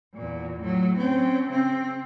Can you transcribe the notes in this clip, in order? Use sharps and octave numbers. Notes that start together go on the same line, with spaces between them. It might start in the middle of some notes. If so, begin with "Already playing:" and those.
E2 A#2
A2 F#3
C4 C#4
C#3 C4